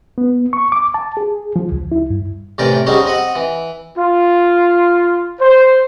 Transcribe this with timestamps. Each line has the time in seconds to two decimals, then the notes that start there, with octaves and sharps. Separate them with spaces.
0.18 B3
0.53 C#6
0.72 D6
0.94 A5
1.17 G#4
1.56 F3
1.72 C#2
1.92 E4
2.10 G2
2.58 A2 C3 E3 A#4 D5 G5
2.86 G3 C4 C#4 D#4 F#4 G#4
3.05 C4 D#5 F#5
3.35 E3
3.98 F4
5.40 C5